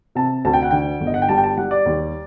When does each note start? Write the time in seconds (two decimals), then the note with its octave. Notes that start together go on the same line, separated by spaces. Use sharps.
0.15 C3 A5
0.45 D2 A5
0.53 G5
0.63 F#5
0.71 D3 G5
1.01 G1
1.07 D#5
1.14 F#5
1.22 G5
1.29 G3 A5
1.37 G5
1.44 A5
1.57 G3 F#5
1.71 D5
1.86 D#2